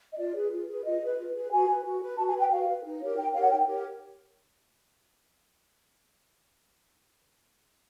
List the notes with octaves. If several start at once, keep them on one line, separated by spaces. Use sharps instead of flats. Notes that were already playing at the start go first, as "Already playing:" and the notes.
D#5
F4 D5
G#4 B4
F4
G#4 B4
F4 D#5
G#4 B4
F4
G#4 B4
F#4 G#5
B4
F#4
B4
F#4 A5
G#5
B4
G5
F#4 F5
B4
D#4
G4 A#4 C#5
D#4 G5
G4 A#4 C#5 F5
F#5
D#4 G5
G4 A#4 C#5